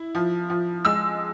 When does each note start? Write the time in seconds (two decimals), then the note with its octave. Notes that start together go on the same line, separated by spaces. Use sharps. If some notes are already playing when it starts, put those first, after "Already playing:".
Already playing: E4
0.15 F3
0.50 F3
0.85 G#3 E6